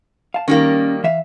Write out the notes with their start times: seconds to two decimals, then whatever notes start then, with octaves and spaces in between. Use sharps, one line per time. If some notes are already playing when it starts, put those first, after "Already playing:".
0.34 F5 A5
0.48 D#3 G3 A#3 C#4
1.04 E3 E5 F5